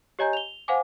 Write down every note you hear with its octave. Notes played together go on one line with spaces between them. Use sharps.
G4 C#5 D#5 G#5 A#5 G6
F7 G7
C5 F5 F#5 G#5 D6